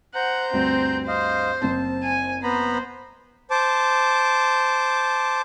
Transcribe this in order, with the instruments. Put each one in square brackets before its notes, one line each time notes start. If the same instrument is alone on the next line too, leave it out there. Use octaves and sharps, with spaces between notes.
[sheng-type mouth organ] C5 A#5 G6 [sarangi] F#5
[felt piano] D2 G2 [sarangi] C4
[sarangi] C5 [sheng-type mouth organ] D#5 F5
[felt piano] F#1 C4 [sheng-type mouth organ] A5
[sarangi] G#5
[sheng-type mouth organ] B3 A#5 B5 [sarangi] C5
[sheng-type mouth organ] C5 A5 D6